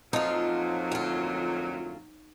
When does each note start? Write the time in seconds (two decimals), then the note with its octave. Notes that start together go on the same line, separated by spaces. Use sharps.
0.13 F2 A#2 F3 F#3 D#4 F4
0.92 D2 F4